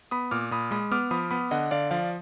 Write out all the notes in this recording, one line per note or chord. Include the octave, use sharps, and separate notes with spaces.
B3 B5 D#6
A#2 D6 F6
A#2 B5 D#6
G#3 B5 D#6
B3 D6 F6
F3 B5 D#6
B3 B5 D#6
D3 D#5 F#5
D3 D5 F5
F3 D5 F5